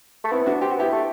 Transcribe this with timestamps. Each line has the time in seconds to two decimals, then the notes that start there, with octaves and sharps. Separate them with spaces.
0.24 A3
0.32 B3 C4 E4
0.46 D4 F#4
0.61 C4 G4
0.70 F#4
0.77 B3 E4 G4
0.92 A3